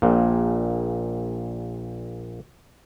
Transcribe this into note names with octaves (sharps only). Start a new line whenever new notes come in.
A#1 A#2